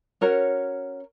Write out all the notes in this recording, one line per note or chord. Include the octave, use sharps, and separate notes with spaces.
C#4 F#4 A#4 C#5